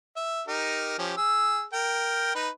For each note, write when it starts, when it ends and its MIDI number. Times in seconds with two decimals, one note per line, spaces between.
0.16 0.42 76
0.47 0.97 63
0.47 0.97 67
0.47 0.97 70
0.98 1.13 53
0.98 1.13 61
0.98 1.13 67
1.17 1.63 68
1.17 1.63 88
1.73 2.35 70
1.73 2.35 79
2.35 2.49 63
2.35 2.49 71